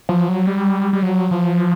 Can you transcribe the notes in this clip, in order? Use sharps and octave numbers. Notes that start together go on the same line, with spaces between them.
F3
F#3
G3
G3
F#3
F3